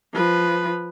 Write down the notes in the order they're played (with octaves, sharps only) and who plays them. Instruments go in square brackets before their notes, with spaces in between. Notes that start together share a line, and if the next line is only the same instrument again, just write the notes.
[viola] F3 B4